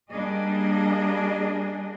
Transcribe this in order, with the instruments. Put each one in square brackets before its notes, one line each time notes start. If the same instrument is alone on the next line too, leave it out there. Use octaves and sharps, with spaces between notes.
[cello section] G3 A#3 D4 G#4 D#5